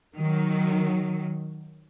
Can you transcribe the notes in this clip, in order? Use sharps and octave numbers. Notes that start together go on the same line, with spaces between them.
D#3 F#3